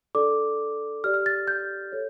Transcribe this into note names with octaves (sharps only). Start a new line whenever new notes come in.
D4 A4 D5 D6
G4 D5 F6
F6
A6
G6
A4 C#5